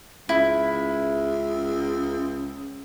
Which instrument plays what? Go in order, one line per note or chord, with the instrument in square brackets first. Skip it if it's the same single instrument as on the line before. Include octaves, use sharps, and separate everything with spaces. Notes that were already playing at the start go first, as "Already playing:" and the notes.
[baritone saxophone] C#2 [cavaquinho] E4